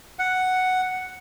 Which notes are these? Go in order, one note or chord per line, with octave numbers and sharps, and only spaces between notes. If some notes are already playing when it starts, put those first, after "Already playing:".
F#5